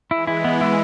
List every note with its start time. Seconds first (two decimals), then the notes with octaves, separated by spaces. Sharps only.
0.11 E3 G#3 E4
0.27 E4
0.44 B3
0.61 E4